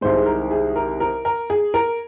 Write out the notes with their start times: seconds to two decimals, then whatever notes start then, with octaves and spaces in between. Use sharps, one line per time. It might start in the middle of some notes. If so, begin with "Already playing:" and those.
0.01 C2 C3 D#3 G#3 C5
0.16 G#4
0.26 A#4
0.51 G#4
0.76 A#4
1.00 A#4
1.25 A#4
1.50 G#4
1.74 A#4